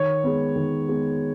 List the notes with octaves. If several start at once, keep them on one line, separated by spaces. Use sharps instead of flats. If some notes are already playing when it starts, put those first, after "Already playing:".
Already playing: D#3 C#5
G#3 B3
D#3
G#3 B3